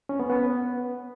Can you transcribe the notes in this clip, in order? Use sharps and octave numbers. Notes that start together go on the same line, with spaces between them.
C#4
B3
B3